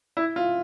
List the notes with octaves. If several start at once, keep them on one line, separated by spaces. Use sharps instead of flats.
E4
F4